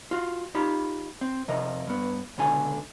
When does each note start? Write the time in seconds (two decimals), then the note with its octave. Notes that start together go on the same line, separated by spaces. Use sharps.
0.11 F4 F#4
0.55 D#4 F4 G4 B5
1.21 C4
1.48 F2 C3 A#4 D#5
1.87 G2 B3
2.38 C#2 B2 D3 A4 G#5